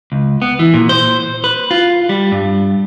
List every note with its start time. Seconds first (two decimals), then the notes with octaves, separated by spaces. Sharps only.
0.12 C#2
0.42 B3
0.59 E3
0.74 A#2
0.89 C5
1.44 B4
1.71 F4
2.09 G3
2.32 G2